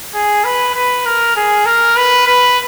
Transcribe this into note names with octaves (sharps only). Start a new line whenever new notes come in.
G#4
B4
B4
A#4
G#4
A#4
B4
B4